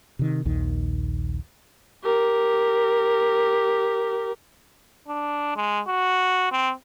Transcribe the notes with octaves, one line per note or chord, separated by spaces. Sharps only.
C3 D#3
A#1 D#2 D#3
G4 A#4
D4
G#3
F#4
C4